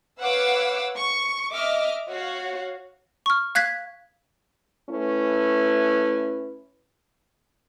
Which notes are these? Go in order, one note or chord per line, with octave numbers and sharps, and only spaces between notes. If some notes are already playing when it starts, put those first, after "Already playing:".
B4 C#5 F5 F#5 D6 E6
C#6
D#5 E5 D6 F6
F#4 C#5 F5
C#6 F6
F5 F#6 G#6 B6
A3 C#4 E4 B4